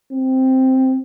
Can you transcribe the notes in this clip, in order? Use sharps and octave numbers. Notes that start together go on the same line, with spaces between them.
C4